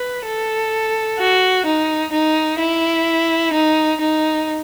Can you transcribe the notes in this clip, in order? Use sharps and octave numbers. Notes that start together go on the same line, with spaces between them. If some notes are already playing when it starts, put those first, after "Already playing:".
Already playing: B4
A4
F#4
D#4
D#4
E4
D#4
D#4